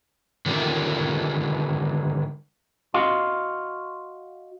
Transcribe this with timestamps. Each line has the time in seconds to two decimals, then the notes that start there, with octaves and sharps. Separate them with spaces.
0.46 D3 D#3 G3 F4 A#4
2.94 F#4 D#5 F5 C6